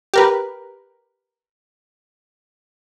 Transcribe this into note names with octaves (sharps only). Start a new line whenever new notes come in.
G4 A#4 B4